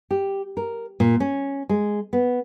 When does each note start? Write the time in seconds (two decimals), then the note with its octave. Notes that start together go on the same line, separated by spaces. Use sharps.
0.11 G4
0.57 A#4
1.00 A#2
1.20 C#4
1.69 G#3
2.13 B3